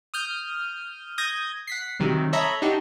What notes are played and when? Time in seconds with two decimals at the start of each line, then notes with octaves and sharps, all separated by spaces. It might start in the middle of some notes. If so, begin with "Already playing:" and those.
0.14 D#6 F6 G6
1.18 D#6 G6 G#6 A#6
1.67 F#5 B6 C7
2.00 C3 D#3 F#3 G3
2.33 A4 C#5 D#5 E5 A#5 B5
2.62 D4 D#4 F#4 G4